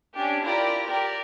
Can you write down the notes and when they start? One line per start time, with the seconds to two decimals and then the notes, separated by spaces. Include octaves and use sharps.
0.14 C#4 D4 G4
0.43 E4 F4 G4 A#4 D5 A#5
0.86 G4 A#4 D5